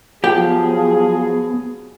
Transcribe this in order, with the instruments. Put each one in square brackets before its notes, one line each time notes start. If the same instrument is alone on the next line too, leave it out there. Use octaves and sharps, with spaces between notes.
[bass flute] F3 [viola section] F#3 G#4 [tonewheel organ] B3 [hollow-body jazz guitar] G4 G5